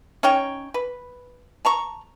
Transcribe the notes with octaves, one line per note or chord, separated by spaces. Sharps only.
C#4 D#4 C#5 G5
B4
A5 A#5 C#6